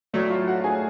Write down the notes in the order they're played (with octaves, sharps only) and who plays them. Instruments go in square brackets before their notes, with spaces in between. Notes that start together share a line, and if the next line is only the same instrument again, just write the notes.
[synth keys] A2 F#3 A3 [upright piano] D5
[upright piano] F4 F5
F#4 F#5
G#4 G#5